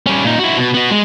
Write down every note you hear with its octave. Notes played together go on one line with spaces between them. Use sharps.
G3 C#4
A#2 D#4
E4 F#4
B2
B3 F#4
G#3